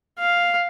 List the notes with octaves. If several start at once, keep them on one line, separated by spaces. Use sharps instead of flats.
F5